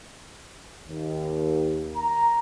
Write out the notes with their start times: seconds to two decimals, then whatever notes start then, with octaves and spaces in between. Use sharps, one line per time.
0.87 D#2
1.96 A#5